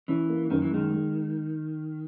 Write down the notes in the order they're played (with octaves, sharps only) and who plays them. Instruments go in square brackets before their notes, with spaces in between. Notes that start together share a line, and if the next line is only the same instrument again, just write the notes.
[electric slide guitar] E3 [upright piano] C#4
[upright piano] A#3
[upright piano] F#2 [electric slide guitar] D#3
[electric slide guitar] E3
[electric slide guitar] D#3 [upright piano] G#3
[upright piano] G#3